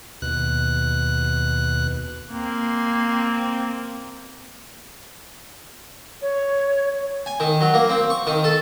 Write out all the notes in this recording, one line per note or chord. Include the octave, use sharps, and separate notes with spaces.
D#2 B2 F#6
A#3 C4
C#5
G#5
D#3
F#3
A#3
C4
C#6
D#3
A4